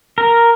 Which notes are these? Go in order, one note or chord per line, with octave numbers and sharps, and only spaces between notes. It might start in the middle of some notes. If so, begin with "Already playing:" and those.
A#4